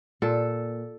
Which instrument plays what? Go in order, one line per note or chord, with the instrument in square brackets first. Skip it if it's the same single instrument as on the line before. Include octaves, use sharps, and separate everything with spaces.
[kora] A#2 A4